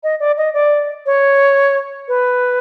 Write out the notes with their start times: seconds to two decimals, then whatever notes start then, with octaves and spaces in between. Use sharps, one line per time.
0.03 D#5
0.20 D5
0.37 D#5
0.53 D5
1.06 C#5
2.08 B4